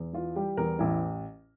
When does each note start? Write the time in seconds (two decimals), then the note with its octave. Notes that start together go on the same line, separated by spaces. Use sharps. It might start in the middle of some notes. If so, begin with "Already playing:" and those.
Already playing: E2
0.13 E3 F4
0.36 G3 G4
0.57 E2 A#4
0.79 A1 E4